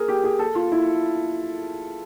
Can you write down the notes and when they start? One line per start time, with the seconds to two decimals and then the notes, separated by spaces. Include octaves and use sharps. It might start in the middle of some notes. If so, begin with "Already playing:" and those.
Already playing: G#4 A#4
0.08 G4
0.24 G#4
0.39 A4
0.55 F4
0.72 E4